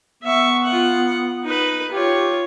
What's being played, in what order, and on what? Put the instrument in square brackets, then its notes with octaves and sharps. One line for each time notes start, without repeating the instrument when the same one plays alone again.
[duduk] B3 [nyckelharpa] E5 C#6
[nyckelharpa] F4 F#5
D#4 B4
[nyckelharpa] F4 C#5 [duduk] G4